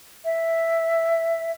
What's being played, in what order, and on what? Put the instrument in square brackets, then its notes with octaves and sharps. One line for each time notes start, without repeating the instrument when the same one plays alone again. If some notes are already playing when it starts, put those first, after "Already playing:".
[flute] E5